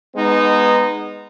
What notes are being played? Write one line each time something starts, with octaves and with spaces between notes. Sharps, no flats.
G#3 B3 D#4